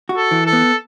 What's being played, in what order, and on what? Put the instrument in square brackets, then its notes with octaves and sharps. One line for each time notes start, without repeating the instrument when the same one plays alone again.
[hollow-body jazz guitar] F#4
[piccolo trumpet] A4
[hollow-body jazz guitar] E3
[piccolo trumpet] A4
[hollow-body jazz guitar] B3